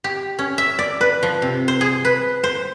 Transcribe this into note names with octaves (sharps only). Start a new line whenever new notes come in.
G4
C#4
E5
D5
B4
F3
C3
C5
G#4
B4
C5